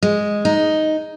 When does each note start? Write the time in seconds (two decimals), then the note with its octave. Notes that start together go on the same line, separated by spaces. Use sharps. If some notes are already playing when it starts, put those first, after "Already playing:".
0.03 G#3
0.45 D#4